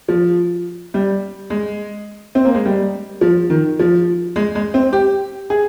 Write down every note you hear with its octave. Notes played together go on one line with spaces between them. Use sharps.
F3
G3
G#3
C4
A#3
G#3
G3
F3
D#3
F3
G#3
G#3
C4
G4
G#4